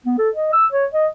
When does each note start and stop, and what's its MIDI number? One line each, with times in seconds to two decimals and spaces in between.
0.06 0.14 59
0.18 0.30 69
0.35 0.50 75
0.53 0.66 88
0.72 0.86 73
0.93 1.07 75